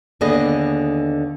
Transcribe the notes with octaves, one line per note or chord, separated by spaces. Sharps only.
D#2 D3 B3 G#4 D#5